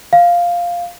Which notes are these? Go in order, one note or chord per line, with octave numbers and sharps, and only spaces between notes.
F5